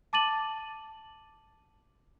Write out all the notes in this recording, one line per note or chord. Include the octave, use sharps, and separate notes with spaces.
A5 D6 A6 D#7 F#7